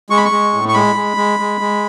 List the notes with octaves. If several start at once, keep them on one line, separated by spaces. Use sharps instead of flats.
G#3 C#6
B5
C#6
G#3
A2
C#6
G#3 B5
G#3
G#3
G#3
G#3